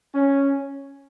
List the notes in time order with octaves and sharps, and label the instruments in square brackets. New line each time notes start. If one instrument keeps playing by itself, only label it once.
[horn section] C#4